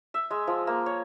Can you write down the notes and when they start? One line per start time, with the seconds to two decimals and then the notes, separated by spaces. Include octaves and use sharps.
0.14 E5
0.31 G#3
0.47 F3
0.67 A#3
0.86 C#5